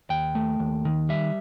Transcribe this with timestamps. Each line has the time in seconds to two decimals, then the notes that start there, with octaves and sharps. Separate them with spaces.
0.10 D#2 G5
0.35 A3
0.59 D#2
0.85 D#3
1.09 G3 E5